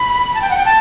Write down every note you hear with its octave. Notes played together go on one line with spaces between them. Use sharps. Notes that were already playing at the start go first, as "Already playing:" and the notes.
Already playing: B5
A5
G5
F#5
G5
A5